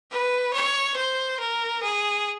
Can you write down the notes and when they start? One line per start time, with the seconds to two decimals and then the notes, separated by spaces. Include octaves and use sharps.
0.11 B4
0.53 C#5
0.96 C5
1.40 A#4
1.83 G#4